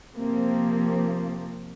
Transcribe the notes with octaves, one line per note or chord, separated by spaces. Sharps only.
C3 F3 A#3 C4